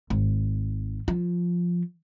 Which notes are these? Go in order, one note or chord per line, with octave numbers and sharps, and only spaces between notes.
G#1
F3